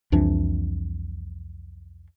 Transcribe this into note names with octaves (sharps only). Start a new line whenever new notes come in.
C2 F2 E3 D4